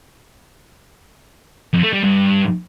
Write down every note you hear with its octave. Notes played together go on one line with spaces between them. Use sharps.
F2
A3
G3
G2